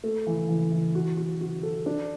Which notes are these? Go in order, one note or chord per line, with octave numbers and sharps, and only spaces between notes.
A3
E3
E3
E3
F#4
F#4
F#4
A4
D4